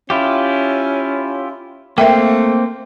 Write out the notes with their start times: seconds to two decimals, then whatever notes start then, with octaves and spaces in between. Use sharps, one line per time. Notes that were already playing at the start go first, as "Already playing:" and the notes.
0.10 C#4 E4 F4 G4
1.98 A3 A#3 C4 A#4 E5 G5